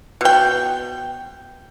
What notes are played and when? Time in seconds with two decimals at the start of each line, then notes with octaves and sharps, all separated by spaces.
0.21 B2 G5